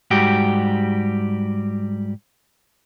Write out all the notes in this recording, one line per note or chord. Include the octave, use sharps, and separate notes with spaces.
G#2 G3 F#4 G4